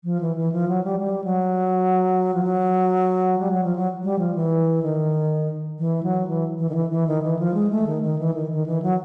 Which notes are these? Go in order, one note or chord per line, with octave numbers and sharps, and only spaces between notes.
F3
E3
E3
F3
F#3
G3
G3
F#3
F3
F#3
G3
F#3
F3
F#3
G3
F3
E3
D#3
E3
F#3
E3
E3
D#3
E3
E3
D#3
E3
F3
G#3
A3
D#3
D#3
E3
D#3
D#3
E3
F#3